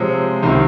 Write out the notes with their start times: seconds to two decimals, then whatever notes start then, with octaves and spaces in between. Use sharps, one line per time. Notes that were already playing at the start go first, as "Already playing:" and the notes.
Already playing: C3 F3 G#3 C4 C#5
0.42 C2 C3 D#3